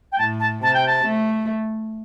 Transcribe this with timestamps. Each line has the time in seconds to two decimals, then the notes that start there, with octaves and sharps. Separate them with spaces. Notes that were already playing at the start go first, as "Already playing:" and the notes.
0.12 G5
0.18 A2 A5
0.40 A5
0.62 C3 A5
0.74 G5
0.86 A5
1.05 A3